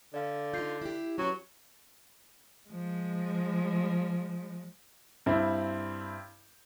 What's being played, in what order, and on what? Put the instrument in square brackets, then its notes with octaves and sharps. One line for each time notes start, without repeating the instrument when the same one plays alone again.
[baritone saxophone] D3 [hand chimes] D5 F5
[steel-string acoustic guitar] D#4 F4 [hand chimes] G6 C7
[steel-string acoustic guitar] E4 G4
[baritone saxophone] F#3 [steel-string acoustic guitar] C#4 B4
[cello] F3 G#3
[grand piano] G2 C4 E4